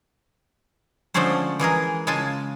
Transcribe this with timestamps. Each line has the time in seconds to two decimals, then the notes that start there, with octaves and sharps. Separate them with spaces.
1.14 D3 F3 G#3 A3 C#4 C5
1.59 E3 G#3 G#4 A#4
2.07 C#3 G#3 F4 G#5 A5